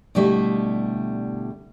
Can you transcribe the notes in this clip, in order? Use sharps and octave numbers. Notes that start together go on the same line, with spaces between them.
B2 D3 G3 A3 E4